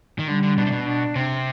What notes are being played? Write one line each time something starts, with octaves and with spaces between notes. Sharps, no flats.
D#3
D3 G3
D3
B2 D4
C3
B2
D4
C3 C4